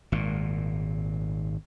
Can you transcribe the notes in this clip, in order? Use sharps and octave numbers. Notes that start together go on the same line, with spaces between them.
G#1 A#2